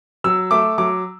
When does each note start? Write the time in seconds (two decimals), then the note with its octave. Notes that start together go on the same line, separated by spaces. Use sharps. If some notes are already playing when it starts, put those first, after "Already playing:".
0.24 F#3 E6
0.51 A3 D6
0.78 F#3 D6